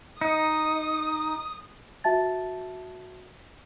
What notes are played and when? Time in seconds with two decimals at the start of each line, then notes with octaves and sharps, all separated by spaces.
0.21 D#4 D#6
2.04 F#4 E5 A5 A6